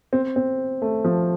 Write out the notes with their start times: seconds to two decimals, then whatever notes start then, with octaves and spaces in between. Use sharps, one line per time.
0.13 C4
0.36 C4
0.82 A3
1.05 F3